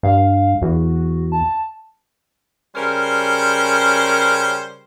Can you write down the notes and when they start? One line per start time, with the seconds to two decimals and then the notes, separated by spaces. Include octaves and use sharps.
0.03 G2 F5
0.62 E2 F#4
1.32 A5
2.76 C#3 G3 C#4 A#4 C5